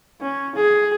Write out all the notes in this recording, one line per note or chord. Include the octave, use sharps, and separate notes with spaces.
C#4
G#4